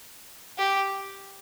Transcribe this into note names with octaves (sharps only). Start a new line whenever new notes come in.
G4